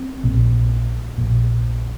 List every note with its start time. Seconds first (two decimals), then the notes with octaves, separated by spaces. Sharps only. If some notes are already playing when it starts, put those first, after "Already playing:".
Already playing: C4
0.24 A#1 A#2
1.18 A#1 A#2